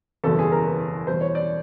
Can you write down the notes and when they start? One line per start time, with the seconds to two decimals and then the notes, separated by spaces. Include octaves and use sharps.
0.24 F#1 E2 B2 G3 A4
0.39 G#4
0.52 A#4
0.66 B4
1.07 E2 B2 G3 C5
1.21 C#5
1.35 D5